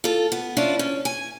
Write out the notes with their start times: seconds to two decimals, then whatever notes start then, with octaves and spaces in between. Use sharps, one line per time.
0.04 F4 A4
0.32 B3
0.57 C#4 D4 E4 F4 D5
0.79 C#4
1.05 G#5